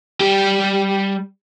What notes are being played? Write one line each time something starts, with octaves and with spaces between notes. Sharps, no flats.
G3 G4